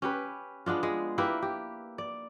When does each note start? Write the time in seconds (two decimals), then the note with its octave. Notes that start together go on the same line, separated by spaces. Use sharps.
0.02 C#4 G4 B4
0.66 G#3 B3 D4 F4
0.83 G#3
1.18 A#3 E4 G4 B4
1.42 G4
1.98 D5